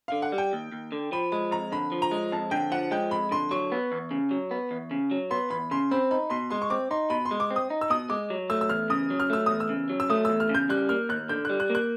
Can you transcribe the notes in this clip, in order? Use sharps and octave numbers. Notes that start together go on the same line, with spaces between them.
D3 F5
F#5
G3
G5
D#2
D#2
D3
F3 B5
G#3 B5
F2 A#5
D3 B5
F3
A#5
G#3
F2 A5
D3 G5
F3 F#5
G#3 G5
F2 B5
D3 C6
F#3 C#6
B3
E2
C#3
F#3
B3
E2
C#3
F#3
B3 C6
E2 B5
C#3 C6
C4 B5
D#4 B5
B2 C6
G#3 C6
C#6
C4 D6
D#4 C6
B2 B5
C6
G#3
D6
C4
D#6
D#4
E6
B2 D#6
G#3 D6
F#3
A3 E6
E6
E2 F6
C#3 D#6
F#3
F6
A3 E6
E2 D#6
E6
C#3
F#3
E6
A3 D#6
E2 E6
F6
C#3
G6
G3 F#6
A#3 F6
D#2 F#6
D3 G6
G3 F#6
F#6
A#3
F#6